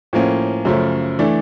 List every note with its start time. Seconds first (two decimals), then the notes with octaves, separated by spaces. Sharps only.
0.13 A2 F3 A#3 C#4
0.65 F#2 C#3 F3 A3
1.19 E3 A3 D4